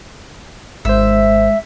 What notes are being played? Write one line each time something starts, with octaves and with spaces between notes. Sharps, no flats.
G#1 G#3 C5 E5